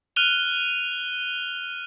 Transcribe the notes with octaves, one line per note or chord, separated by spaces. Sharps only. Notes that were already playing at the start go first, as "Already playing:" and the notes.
F6 F#6 D#7 F7 G7